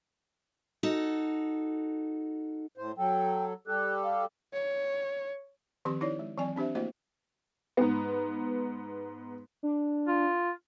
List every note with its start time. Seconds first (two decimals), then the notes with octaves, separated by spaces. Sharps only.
0.83 D#4 F#4 A4
2.78 A2 C5
2.98 F#3 A4 G5
3.67 G3 G4 A4 F#6
4.04 F5
4.53 C#5
5.85 D#3 F3 C4 G4 C6
6.01 D#4 E4 C#5 D5
6.19 G#3
6.38 E3 F#3 C4 D5 G#5
6.56 C4 D4 G4 C5 E5
6.75 A3 A#3 E4 F#4 C5 D#5
7.77 G#2 B3
9.63 D4
10.08 F4